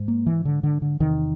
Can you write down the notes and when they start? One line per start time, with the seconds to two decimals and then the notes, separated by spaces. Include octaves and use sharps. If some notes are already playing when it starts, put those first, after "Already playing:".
Already playing: G#2
0.08 A#3
0.27 E3
0.45 D3
0.63 D3
0.82 D3
1.00 E2 C3 D#3